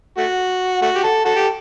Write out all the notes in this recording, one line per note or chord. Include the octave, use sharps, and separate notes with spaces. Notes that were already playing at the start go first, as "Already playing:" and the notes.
A3 F#4
A3 F#4
G4
A4
F#4 A4
G4